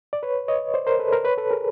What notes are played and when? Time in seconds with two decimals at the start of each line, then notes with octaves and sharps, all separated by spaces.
0.13 D5
0.23 B4 C#5
0.48 C#5 D#5
0.74 C5 D5
0.87 A#4 C5
0.99 A4 B4
1.12 A#4 C5
1.25 B4 C#5
1.38 A4 B4
1.51 G#4 A#4